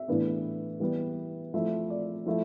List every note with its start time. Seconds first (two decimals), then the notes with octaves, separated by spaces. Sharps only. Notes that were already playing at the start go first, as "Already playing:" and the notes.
Already playing: E5
0.08 A2 E3 B3 D4
0.80 E3 G3 B3
1.54 F3 A3 E4 E5
1.90 D5
2.26 F3 A3 E4 E5